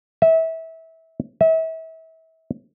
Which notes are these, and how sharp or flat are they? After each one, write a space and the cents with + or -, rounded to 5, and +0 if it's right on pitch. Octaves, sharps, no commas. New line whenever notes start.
E5 -25
E5 -35